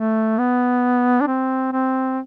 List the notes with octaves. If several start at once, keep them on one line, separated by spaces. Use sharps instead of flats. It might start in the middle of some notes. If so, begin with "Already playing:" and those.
Already playing: A3
B3
D4
C4
C4